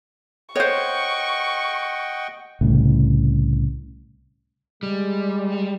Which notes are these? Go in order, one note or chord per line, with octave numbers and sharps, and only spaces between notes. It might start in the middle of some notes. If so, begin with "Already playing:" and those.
C5 C#5 D#5 F#5 G5 C#6
C2 A2 C#3
G3 G#3